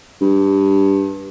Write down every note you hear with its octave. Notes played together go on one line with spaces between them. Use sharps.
G2